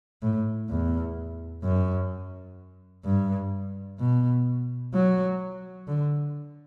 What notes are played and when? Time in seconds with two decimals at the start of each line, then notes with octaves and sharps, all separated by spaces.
0.22 A2
0.69 E2
1.63 F#2
3.05 G2
3.99 B2
4.94 F#3
5.88 D3